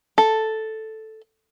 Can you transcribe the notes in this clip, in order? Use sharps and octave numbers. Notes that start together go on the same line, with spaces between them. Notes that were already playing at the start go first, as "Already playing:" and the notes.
A4